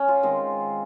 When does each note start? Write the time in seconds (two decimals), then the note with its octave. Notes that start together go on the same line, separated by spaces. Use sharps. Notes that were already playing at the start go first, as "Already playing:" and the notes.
Already playing: C#4
0.08 F4
0.23 D#3 G#3 C4